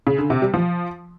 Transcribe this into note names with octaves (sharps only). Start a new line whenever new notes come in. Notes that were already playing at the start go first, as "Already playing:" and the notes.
C#3
D3
C3
G3
F3